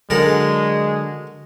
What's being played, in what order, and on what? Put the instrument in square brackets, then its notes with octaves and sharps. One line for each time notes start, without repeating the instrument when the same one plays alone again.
[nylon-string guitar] D3 F#3 [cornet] G#3 [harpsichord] A4 A#4 F#5